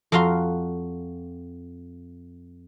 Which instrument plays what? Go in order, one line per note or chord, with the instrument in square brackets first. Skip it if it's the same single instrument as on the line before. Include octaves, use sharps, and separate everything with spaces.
[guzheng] F2 F#4 F5 A#5 C6